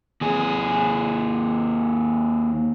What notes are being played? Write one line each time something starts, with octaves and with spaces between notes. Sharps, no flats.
D#2 G#4